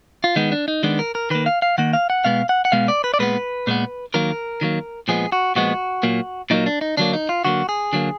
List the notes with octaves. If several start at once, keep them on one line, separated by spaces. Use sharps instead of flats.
F4
D#3 G#3 B3 D#4
D4
D#4
D#3 G#3 B3 D4
A#4
A#4
D#3 A#3 B4
F5
F5
D#3 A#3 F#5
F5
F#5
B2 G#3 B3 F5
F#5
F#5
B2 G#3 B3 F5
D5
B4
D5
A#2 G#3 B3 B4
A#2 G#3 B3
D#3 F#3 A#3 A#4
D#3 F#3 A#3
A#2 F3 G#3 B3 G#4
F#4
A#2 F3 G#3 B3 F#4
A#2 F#3 A#3
A#2 F#3 A#3 D#4
D4
D#4
D3 F#3 A#3 D4
D#4
F4
D3 F#3 A#3 F#4
G#4
D3 F#3 A#3